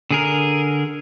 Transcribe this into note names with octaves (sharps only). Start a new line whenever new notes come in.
D3 G#4 A#4